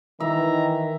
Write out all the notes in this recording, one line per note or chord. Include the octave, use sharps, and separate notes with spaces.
D#3 E3 E5 A#5